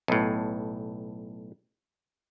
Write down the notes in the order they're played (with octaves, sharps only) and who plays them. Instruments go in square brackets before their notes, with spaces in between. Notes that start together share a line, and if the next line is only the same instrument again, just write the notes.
[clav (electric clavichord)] B1 A2